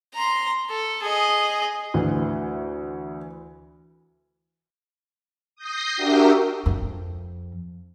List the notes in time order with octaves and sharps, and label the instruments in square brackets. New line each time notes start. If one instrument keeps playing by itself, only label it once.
[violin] A#5 C6
A4
G#4 D#5
[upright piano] D2 [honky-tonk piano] E3
[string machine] D#6 G6 A#6 C7
D4 F#4 G4 A#4 E5 G5
[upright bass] F2